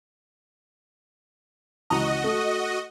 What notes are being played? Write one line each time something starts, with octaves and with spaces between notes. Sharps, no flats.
C#2 E3 F#4 D#5 A#5
A3